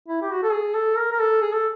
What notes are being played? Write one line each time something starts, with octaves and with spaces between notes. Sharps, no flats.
E4
G4
F#4
A4
G#4
A4
A#4
A#4
A4
G#4
A4